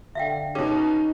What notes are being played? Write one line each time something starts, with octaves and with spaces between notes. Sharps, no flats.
D3 E5 F5 G5
B2 C#4 D#4 G#4